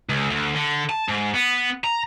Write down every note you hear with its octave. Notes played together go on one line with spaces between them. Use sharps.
C#2
D2
D3
A5
G#2
B3
A#5